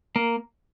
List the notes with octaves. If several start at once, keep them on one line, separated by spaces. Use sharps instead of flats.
A#3